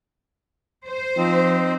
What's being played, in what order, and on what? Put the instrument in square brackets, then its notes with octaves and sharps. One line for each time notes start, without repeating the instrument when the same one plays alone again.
[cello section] C5
[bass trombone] F3 [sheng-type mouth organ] C4 D#4